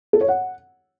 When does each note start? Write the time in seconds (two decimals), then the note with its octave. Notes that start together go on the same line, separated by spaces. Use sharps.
0.13 A4
0.21 C#5
0.28 F#5